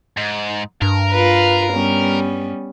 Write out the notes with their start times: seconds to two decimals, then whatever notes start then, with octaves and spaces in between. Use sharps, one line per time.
0.17 G#2
0.82 G2 A#4
1.12 F4 B4
1.73 G3 B3 C#4